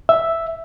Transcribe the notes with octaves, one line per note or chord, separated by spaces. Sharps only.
E5